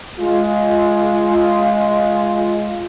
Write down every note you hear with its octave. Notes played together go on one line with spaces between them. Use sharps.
G#3 F4